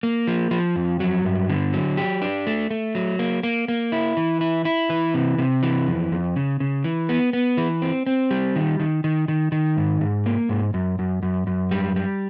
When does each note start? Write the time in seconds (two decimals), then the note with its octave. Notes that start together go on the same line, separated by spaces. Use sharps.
0.03 A#3
0.27 F3
0.51 F3
0.76 F2
1.00 F#3
1.25 G2
1.49 D3
1.73 F#3
1.97 G4
2.22 D4
2.47 A3
2.70 A3
2.95 F#3
3.19 A#3
3.43 A#3
3.68 A#3
3.92 E4
4.17 E3
4.41 E4
4.65 E4
4.90 E3
5.14 C3
5.38 C3
5.63 E3
5.87 F2
6.12 F2
6.36 C#3
6.60 C#3
6.84 E3
7.09 B3
7.33 B3
7.57 E3
7.82 C4
8.07 C4
8.31 G3
8.56 D#3
8.80 D#3
9.04 D#3
9.28 D#3
9.52 D#3
9.77 G#2
10.01 G#2
10.26 A#3
10.49 G#2
10.74 F#2
10.99 F#2
11.23 F#2
11.47 F#2
11.71 G3
11.96 G3